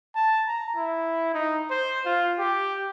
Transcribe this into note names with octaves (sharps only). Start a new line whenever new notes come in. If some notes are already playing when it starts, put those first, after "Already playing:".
A5
A#5
E4
D#4
C5
F4
G4